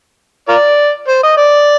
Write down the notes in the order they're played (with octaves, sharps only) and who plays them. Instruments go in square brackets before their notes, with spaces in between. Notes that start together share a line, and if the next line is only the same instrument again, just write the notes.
[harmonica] F4 A#4 D5
C5
D#5
D5